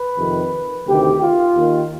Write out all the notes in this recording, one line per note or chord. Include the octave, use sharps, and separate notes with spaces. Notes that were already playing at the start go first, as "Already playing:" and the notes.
Already playing: B4
F2 C3 D#3
D2 C3 D#3 G4
F4
D#2 D#3